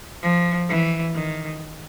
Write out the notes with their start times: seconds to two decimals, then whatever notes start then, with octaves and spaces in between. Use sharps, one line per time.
0.23 F3
0.68 E3
1.14 D#3